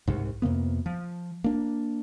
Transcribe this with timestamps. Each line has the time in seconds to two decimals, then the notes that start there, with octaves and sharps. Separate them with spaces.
0.07 C2 G#2
0.42 F2 C3 A#3 B3
0.86 F3
1.44 A#3 D4